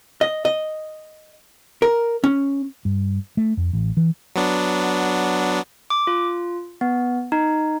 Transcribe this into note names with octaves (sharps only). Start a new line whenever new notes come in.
D#5
D#5
A#4
C#4
G2
A3
F2
A1
E3
F#3 B3 D4
D6
F4
B3
D#4